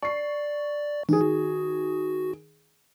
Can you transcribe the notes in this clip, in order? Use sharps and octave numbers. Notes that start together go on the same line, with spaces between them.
D5 C#6 C7
D#3 E3 G#4
F#4